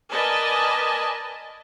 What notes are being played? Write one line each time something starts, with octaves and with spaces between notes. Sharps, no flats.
A#4 B4 D5 D#5 G#5 A5